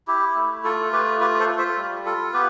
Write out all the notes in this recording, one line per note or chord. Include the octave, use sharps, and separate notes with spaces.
E4 G4
A3
F4 A4
A3 G4 B4
F4 G4 B4
A4 C5
F4
C5 E5
G3
F4 A4
B3 G4 B4